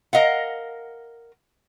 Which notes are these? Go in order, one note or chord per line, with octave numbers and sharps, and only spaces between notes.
A#4 D#5 F5 F#5